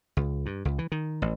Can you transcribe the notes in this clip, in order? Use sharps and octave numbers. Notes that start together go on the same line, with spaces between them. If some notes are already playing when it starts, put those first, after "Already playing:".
C#2
G2
C#2
E3
D#3
A1